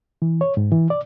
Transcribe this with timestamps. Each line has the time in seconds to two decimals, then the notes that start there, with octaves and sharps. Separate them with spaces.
0.22 E3
0.41 C#5
0.57 G#2
0.72 E3
0.90 D5